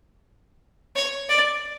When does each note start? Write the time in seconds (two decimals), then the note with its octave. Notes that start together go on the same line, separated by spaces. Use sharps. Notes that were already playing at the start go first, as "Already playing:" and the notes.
0.96 C#5
1.29 D5